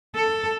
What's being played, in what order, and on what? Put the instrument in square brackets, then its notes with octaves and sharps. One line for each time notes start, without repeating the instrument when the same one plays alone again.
[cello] A4